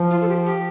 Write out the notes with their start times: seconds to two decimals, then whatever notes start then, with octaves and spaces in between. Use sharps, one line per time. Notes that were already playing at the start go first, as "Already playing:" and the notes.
Already playing: F3
0.11 F4
0.21 A4
0.28 G4
0.46 G4